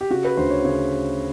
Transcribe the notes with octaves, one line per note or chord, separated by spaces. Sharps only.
G4
C#3 F#4
B4
D2 C5
C#5
C#3 C#5